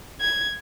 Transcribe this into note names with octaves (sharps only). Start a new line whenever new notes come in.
G#6